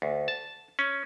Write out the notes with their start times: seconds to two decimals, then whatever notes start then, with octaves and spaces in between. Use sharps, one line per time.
0.02 D2
0.28 A5
0.79 C#4